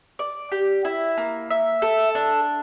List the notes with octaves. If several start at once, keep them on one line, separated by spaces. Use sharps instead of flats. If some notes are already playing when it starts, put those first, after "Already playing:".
D5
G4
E4
A#3
E5
A4
D4